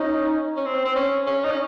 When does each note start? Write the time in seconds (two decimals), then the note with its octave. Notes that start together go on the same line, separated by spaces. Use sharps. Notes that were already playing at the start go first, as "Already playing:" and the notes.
Already playing: C#4 D#4
0.57 C#4
0.65 C4
0.85 C4
0.96 C#4
1.27 C#4
1.44 D#4
1.51 C#4